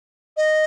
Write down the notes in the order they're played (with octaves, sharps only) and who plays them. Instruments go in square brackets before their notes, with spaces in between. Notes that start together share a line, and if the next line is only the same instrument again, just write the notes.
[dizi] D#5